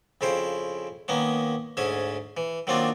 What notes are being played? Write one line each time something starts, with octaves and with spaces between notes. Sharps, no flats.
F2 C#3 E4 C5 G5
D#3 A#3 B3 C#4
D2 G#2 C#4 G#4 E5
E3
D#3 F#3 A#3 C4 D4 F4